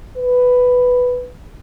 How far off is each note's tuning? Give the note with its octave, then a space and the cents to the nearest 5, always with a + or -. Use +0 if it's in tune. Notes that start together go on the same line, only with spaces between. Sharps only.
B4 +5